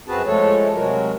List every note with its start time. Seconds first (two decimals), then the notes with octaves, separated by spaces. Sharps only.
0.08 F#2 C4 F#4 G#4 B4 A5
0.26 F3 G#3 A3 A4 C#5
0.75 C3 F#3 G#3 F#4 A#4